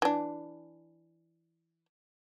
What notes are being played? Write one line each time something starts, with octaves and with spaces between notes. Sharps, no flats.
E3 D4